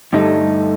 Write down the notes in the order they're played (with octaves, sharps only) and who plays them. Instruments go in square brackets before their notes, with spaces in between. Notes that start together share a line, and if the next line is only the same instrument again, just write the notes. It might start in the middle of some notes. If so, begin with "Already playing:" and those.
[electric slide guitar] G2 D3 A3 D#4 [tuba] G3